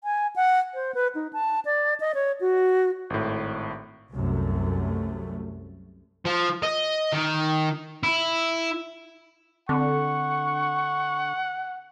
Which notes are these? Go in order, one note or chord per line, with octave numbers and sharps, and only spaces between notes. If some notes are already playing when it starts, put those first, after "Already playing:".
G#5
F#5
C5
B4
D#4
A5
D5
D#5
C#5
F#4
G#1 A2
C2 F#2 C3 A3
F3
D#5
D#3
E4
D3 C4 F#5 C#6